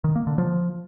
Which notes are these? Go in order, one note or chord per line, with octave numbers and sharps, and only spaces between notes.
D#3
A#3
D3
F3